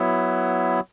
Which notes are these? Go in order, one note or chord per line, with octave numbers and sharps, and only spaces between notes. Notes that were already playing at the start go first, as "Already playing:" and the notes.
Already playing: F#3 B3 E4